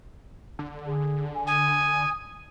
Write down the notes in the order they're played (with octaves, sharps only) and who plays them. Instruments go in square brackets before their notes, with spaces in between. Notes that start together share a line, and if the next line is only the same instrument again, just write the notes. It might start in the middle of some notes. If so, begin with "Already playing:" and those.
[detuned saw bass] D3
[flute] G#4
G#5
[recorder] G#5 [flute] D#6